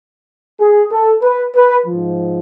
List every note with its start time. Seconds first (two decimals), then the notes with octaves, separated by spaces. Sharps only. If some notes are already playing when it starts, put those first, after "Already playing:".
0.60 G#4
0.91 A4
1.22 B4
1.55 B4
1.86 G#2 F3